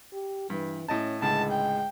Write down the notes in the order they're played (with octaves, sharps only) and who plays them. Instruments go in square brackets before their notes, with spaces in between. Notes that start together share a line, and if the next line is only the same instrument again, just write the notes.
[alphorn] G4
[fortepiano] G2 [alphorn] E3
[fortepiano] A2 D#5 A5 [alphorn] C#4
[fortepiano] C#2 A2 D3 [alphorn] G#3 [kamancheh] A5
[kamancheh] G5